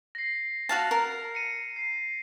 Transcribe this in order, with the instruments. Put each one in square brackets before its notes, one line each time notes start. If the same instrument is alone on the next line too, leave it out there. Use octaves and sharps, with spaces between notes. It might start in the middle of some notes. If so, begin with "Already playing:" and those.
[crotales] A#6 C7
[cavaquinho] F#4 F5 A5
A#4
[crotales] C#7 D#7
C7